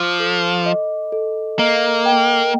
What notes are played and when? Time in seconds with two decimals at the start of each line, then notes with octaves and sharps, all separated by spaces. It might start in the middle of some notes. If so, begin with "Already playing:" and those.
Already playing: F3 D6
0.20 A4
0.66 D#5
1.12 A4
1.59 A#3 D#5
2.06 G5